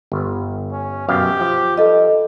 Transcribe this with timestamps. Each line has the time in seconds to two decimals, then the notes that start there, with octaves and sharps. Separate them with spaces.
0.12 G1
0.72 C#4
1.09 F#2 B2 G4 F5
1.41 F3
1.78 G2 A4 D#5